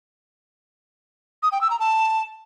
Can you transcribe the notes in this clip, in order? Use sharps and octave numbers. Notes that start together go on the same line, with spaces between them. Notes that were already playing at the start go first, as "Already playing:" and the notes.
D#6
G5
E6
A#5
A5